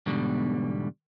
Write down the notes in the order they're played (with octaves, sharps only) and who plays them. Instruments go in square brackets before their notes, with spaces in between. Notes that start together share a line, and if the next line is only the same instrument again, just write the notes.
[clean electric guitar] E2 G#2 B2 D3 G3